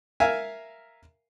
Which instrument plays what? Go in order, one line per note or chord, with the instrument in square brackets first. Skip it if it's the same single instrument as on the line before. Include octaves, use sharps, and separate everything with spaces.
[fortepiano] A#4 E5 F5 G#5